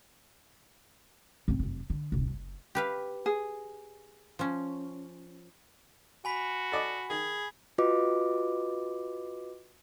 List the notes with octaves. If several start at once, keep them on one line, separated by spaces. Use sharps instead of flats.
F#2 C4
F1 F#2
D3
D#1 C2
F#1
G4 B4 F5
G#4
F3 C#4
F#4 G#5 B5 B6
A4 D5 D#5
D#3 G#4
F4 F#4 B4 D#5 D6